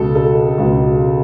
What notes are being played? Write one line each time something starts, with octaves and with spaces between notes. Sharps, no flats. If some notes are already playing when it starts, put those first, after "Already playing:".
Already playing: C#2 B2 A4
A4
C#2 B2